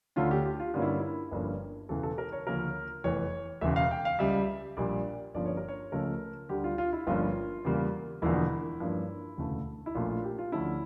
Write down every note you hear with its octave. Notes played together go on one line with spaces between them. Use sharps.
D2 D3 A3 C#4 F4
G4
G4
F4
G2 D3 G3 A#3 C#4 F4
E4
E4
G1 G2 F3 A#3 C#4
E1 E2 C#3 E3 A4
A4
A#4
C#5
D2 C#3 F3 A#3 C#4 A#4
F1 E2 E3 C#5
E1 E2 C#3 E5
F5
G5
F5
C#2 C#3 G3 E5
A#1 A#2 G3 D5
G1 G2 F3 A#3 C#4 D5
C#5
A#4
C#5
C#2 C#3 F3 A3 C#4 A#4
D2 D3 G3 G4
F4
F4
E4
G1 G2 F3 A#3 C#4 F4
E2 C#3 G3 A#3
E1 E2 D3 F3 A#3 E4
G2 F3 A#3 C#4
E1 D2 C#3 E3 A3
E4
A#1 A#2 A3 C#4 F4
F4
G4
F4
D2 D3 F3 A3 C#4 E4